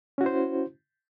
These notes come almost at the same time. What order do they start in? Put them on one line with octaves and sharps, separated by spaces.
C#4 F#4 E4 C5